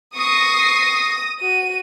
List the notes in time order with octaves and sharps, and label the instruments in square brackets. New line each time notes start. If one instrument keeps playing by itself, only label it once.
[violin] C#6 C7 [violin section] D#6 A#6
[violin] F#4 D#7